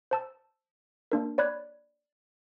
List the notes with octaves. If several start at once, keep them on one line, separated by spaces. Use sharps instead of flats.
C5 A5 E6
A#3 D4 A#4
C#5 D5 B5 F#6 G#6